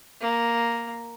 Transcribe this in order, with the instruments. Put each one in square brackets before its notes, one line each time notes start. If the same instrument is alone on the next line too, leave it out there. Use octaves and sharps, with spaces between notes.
[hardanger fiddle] A#3